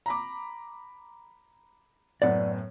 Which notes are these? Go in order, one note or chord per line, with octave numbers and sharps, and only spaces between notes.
A#5 B5 D6
F#2 A2 B3 D5 F#5